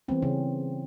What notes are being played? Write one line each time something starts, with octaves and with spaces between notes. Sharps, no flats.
E3 G3 B3 C4
C#3 C#4